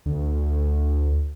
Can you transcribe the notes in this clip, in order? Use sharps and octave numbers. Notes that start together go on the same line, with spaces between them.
D2